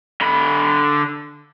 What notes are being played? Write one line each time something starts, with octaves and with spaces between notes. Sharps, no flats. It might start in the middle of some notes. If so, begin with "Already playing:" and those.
D3 B5